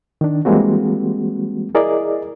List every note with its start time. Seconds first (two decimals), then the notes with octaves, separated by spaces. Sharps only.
0.21 D#3 D4
0.45 E3 G3 G#3 A#3 C4 F#4
1.75 E4 G#4 A#4 D5 D#5